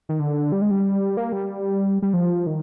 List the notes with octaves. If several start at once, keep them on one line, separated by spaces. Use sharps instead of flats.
D#3
D3
G3
G#3
G3
A#3
G3
G3
F3
D#3